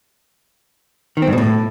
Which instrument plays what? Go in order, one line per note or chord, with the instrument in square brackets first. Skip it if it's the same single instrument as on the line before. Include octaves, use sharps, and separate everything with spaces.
[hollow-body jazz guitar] D#3
C4
G2
B2
A2